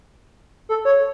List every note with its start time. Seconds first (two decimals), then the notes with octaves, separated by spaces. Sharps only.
0.69 A4
0.85 C#5